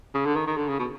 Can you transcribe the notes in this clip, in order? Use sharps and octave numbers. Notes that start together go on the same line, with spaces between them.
C#3
D3
D#3
D#3
D3
C#3
B2